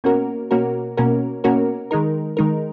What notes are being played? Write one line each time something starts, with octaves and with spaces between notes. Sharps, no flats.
B2 A#3 C#4 F#4 A#4
B2 A#3 C#4 F#4 A#4
B2 A#3 C#4 F#4 A#4
B2 A#3 C#4 F#4 A#4
D#3 G#3 D#4 A#4
D#3 G#3 D#4 A#4